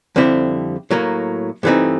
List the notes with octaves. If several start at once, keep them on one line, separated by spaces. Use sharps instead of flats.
F2 D3 G3 C4 E4
A2 F#3 A#3
G2 E3 A3 C4 D#4